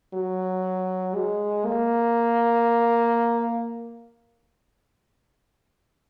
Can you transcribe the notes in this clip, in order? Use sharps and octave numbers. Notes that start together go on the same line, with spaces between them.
F#3
G#3
A#3